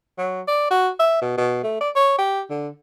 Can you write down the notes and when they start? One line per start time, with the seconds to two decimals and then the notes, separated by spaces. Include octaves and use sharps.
0.18 F#3
0.48 D5
0.71 F#4
0.99 E5
1.22 B2
1.38 B2
1.64 A3
1.81 D5
1.96 C#5
2.19 G4
2.50 D3